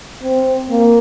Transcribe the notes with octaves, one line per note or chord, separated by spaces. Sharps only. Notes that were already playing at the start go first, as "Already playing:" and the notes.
C4
A#3